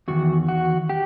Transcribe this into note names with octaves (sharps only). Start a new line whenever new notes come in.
E2 D#3 F#4
F#4
G4